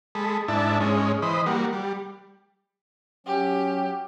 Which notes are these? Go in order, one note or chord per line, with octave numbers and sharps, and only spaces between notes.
G#3 A4 B5
G#2 D4 E4 A5
G#2 G#3 C#4
E3 C5 D#5 B5
G3 A#3 F#4
G3
F#3 C#4 G4